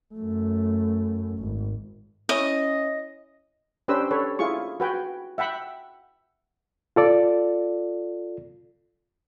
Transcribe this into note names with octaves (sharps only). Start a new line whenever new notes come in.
F#2 A3
G#1
C#4 E4 D#5
C#4 D4 G4 B4 C5 E6
A4 B4 C#5
E4 F4 G#4 C#6
F#4 B4 G5 G#5
E5 F#5 G5 B5
F4 A4 D5